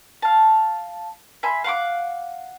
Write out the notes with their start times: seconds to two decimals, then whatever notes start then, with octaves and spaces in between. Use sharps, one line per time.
0.22 F5 A5
1.43 E5 G#5 B5 C6
1.64 F5 F#5 C6 D6